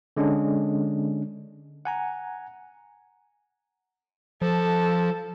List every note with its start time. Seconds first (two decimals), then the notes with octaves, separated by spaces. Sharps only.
0.17 D3 G#3 C#4 D4
1.85 F#5 G#5 A#5
4.42 F3 A4